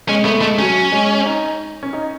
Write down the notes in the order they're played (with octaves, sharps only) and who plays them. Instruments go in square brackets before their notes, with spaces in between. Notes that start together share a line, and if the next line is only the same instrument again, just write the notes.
[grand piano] G#3 [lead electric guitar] C#4
[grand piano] A3 [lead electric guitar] B3
[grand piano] G#3 [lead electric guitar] A3
[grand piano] F#3 [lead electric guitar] C#4
[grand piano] G#3
D#4
C#4
D#4